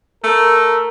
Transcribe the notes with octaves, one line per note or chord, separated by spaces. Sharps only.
A3 A#4